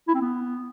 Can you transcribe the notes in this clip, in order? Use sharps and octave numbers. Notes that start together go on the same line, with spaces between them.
E4
C4
B3